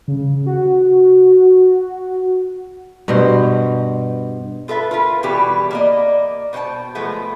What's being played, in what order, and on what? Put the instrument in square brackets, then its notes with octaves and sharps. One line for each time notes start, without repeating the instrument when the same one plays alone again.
[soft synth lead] C#3
F#4
[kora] G2 B2 C5
[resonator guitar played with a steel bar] F4 A4 B4 E5
F4 A#4 B4
B2 E3 G3 G4 G#4
A#3 D5 D#5
B2 C5 C#5 G5 A5
B2 F3 G#3 A3 B3